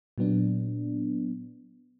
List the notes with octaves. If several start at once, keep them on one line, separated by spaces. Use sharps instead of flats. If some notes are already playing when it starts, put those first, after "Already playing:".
A#2 F#3 B3 D4